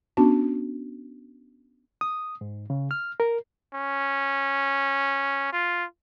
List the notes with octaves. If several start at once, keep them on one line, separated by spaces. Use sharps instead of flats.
B3 C#4 D4 F#4 A5
D#6
G#2
C#3
F6
A#4
C#4
F4